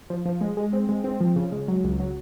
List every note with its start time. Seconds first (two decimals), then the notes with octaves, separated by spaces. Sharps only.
0.10 F3
0.26 F3
0.41 G#3
0.57 G#3
0.73 C4
0.89 G#3
1.04 C4
1.21 F3
1.36 C#3
1.52 G#3
1.68 F#3
1.84 C#2
2.00 F#3